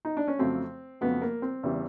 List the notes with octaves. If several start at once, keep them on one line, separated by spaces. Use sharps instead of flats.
D#4
D4
C#4
F2 C#3 F#3 A3 C4
F2 C#3 F#3 A3 B3
A#3
C4
E2 C#3 E3 G3